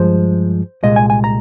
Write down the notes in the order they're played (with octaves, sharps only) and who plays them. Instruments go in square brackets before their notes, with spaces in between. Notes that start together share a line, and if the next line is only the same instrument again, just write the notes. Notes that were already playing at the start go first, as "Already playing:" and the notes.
Already playing: [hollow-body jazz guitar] G2 F3 G#3 C5
C2 A#2 G#3 D#5
G#5
G#5
A#5